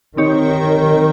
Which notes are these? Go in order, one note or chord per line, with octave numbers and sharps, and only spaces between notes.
D#3 C4 D#4 G4 C#5